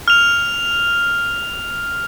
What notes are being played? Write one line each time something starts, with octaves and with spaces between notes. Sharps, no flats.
F6 F7